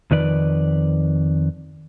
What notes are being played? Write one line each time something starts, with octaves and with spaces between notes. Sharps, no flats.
F2 D#3 B4 D5